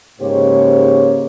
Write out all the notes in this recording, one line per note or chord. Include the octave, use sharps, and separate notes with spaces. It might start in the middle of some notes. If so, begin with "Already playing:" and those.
G#2 C#3 A#3 G4 C5 C#5